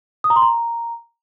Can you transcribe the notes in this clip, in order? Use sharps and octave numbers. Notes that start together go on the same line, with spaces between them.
D#6
A#5
C6
A#5